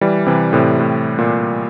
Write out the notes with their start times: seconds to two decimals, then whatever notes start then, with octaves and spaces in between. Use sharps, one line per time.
0.01 E3 G3
0.26 C3 E3
0.53 A2 C3
0.80 A2
1.18 A#2